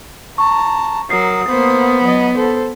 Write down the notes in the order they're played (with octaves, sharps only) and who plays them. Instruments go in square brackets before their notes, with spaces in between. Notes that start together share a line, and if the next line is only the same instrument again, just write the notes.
[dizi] A5 [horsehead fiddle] A#5 [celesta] C#6
[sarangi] F#3 [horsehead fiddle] A#4 [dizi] D#6 [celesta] C7
[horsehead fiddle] A#3 C5 [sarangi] B3
[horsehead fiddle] F#3 D#5
A4 C5